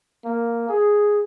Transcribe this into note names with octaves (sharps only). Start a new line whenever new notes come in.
A#3
G#4